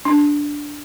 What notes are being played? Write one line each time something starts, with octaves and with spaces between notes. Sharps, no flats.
D4